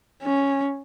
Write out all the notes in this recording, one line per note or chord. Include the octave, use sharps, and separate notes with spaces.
C#4